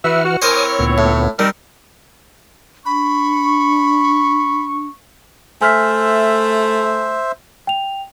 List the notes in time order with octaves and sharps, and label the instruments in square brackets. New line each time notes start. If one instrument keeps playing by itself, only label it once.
[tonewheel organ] E3 F#5 F6 [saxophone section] F#4 B4 E5
[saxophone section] F#4
[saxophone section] C4 E4 C#5 [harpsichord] A#4 C5 [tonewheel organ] G#5 D6 D#6
[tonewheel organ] D2 A#2 B3
[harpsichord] A2
[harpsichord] G3 [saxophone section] C4 D#4 A#4 [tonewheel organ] A5 B5
[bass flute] D4 [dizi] B5 [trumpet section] C#6
[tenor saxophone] A3 [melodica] C5 E5 [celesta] G#5 F6 B6
[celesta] G5 F7